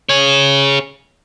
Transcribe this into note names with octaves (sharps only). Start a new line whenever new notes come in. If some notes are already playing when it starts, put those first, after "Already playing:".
G#4 C#5